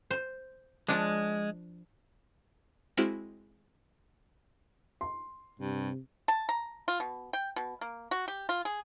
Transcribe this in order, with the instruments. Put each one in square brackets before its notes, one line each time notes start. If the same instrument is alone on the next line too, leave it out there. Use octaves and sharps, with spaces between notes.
[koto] C5
[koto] F3 D4 [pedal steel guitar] G#3
[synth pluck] G#3 C4 E4 F#4 F6 D7
[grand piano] C6
[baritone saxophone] G2 [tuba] C3
[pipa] A5
A#5
F4
B2
G5
B2
A#3
F#4
G4
F4
G#4